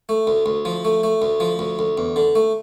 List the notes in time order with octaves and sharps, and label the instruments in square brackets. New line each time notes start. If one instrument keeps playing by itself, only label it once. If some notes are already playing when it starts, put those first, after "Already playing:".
[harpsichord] A3
D2
D2
F3
A3
A3
D2
F3
D2
D2
E2
D3
A3